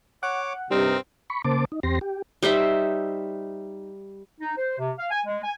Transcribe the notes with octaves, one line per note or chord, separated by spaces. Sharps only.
C#5 F#5 D6
G2 C3 G3 C4 D#4 A#4
B5 C#6
C#3 A#3 C5 A5 D6
D#4
E2 C4 G4 C6 A#6
G4
G3 D#4 C5 E5
D#4
C5
C3
F5
G#5
G#3
G#5